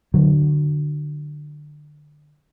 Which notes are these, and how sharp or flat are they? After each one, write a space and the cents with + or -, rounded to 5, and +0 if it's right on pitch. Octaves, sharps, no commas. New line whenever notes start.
D3 +20 F#3 +0